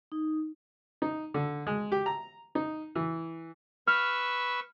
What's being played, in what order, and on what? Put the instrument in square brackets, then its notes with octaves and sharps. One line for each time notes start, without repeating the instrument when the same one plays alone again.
[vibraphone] D#4
[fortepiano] D#4
D3
G#3
G4
A#5
D#4
E3
[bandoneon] B4 C#6 E6 [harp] F6